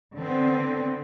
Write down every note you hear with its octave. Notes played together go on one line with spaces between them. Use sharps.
D3 B3 C4